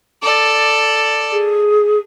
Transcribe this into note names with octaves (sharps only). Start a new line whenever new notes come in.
A4 D5
G#4